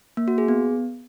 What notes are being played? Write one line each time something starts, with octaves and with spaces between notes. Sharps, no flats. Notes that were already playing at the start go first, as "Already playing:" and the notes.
A#3
F#4
G#4
B3